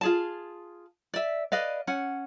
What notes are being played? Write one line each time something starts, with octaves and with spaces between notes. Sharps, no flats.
F4 G#4 A5
D5 E5
B4 D5 D#5 F5
C#4 F#5